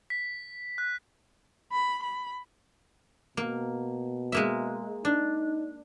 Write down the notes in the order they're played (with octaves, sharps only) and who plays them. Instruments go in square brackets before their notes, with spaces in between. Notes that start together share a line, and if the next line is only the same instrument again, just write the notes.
[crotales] B6
F#6
[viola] B5
B5
[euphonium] B2 [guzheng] A#3
[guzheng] G#3 A#3 E5
[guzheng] D4 [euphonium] D#4